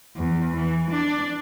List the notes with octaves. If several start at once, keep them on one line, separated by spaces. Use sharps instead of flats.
E2
E3
D4